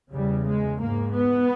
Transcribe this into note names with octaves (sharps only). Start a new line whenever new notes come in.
E2 C#3 G3
G#3
G#2 A#3
B3